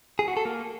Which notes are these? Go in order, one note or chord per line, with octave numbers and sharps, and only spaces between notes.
G#4
F#4
A4
A#3